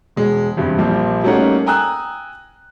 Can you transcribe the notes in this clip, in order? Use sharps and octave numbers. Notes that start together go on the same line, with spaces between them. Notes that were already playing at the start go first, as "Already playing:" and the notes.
E1 G#3
E2 G2 C3
A#1 A#2 F3 G3
G3 A3 A#3 C#4 D#4 F#5
G5 G#5 A#5 D#6 E6 F#6